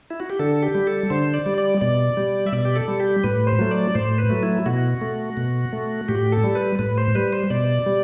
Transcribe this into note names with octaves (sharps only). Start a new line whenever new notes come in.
E4
F#4
G4
D3 A4
G4
G3
A4
D3 C5
D5
G3
D5
B2 D5
G3
E5
B2 D5
G4
A4
G3
G4
A2 B4
C5
F#3 A3
D5
A2 C5
B4
F#3 A3
E4
B2 F#4
A3
B2
A3
A2 G4
A4
G3
B4
A2 B4
C5
G3 B4
C5
B2 D5
G3